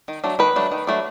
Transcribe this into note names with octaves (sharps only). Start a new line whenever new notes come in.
D#3
F#3 A3 D4
D#3 B4
F#3 A3 D4
D#3
F#3 A3 D4